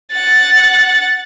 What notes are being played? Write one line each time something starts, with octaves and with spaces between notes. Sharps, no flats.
F#5 A6